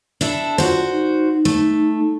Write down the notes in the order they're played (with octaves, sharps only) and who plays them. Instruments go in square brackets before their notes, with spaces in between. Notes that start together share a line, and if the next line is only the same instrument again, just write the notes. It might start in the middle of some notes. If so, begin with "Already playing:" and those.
[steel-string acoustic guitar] D4 E4 A4
[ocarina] F4 [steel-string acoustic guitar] F#4 C5
[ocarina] D#4
[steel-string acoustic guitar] A3